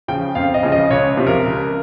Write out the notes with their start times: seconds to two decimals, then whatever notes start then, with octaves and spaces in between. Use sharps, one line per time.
0.08 C#3 F3 G5
0.35 F2 F5
0.54 D#5
0.63 C#3 F3
0.72 D#5
0.90 C#2 C#5
1.17 C3 F3
1.27 A#4
1.45 C#2